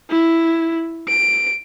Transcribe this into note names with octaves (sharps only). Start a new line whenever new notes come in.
E4
D7